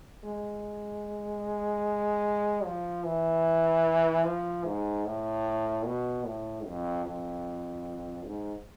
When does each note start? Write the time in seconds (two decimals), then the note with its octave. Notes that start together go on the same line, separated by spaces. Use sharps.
0.24 G#3
2.64 F3
3.04 E3
4.24 F3
4.65 G#2
5.06 A2
5.85 B2
6.26 A2
6.66 F2
7.06 F2
8.26 G#2